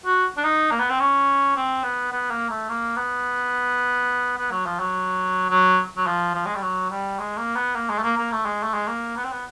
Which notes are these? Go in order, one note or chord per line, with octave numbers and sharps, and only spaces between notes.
F#4
D4
D#4
A#3
B3
C4
C#4
C4
B3
B3
A#3
A3
A#3
B3
B3
F#3
F3
F#3
F#3
F#3
F3
F3
G#3
G3
F#3
G3
G#3
A#3
B3
A#3
G#3
A3
A#3
A#3
A3
G#3
A3
G#3
A#3
B3
C4
B3